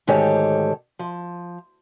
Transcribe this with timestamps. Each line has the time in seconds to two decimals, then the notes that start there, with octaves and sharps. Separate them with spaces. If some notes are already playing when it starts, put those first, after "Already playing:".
0.07 D2 G#2 D#3 G4 A4 C#5
0.99 F3